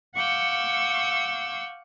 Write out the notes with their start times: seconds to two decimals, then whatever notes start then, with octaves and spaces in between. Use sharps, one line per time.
0.15 F5 F#5 C#6 D6 E6 G6